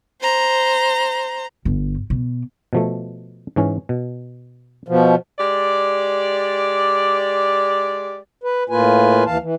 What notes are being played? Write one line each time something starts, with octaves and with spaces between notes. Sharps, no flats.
C5 A#5
G1
B2
B2 F3 A3
G#2 E3 C#4
B2
B2 F3
G#3 G4 D5
B4
A2 A#3 F4 B4 G#5
D#2 E3 F5 A5
E3